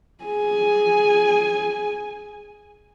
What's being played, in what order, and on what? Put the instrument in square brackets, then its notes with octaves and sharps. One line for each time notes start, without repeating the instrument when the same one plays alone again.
[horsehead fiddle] G#4 G#5